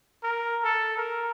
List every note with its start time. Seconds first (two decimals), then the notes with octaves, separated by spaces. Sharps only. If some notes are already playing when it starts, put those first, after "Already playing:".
0.24 A#4
0.64 A4
0.97 A#4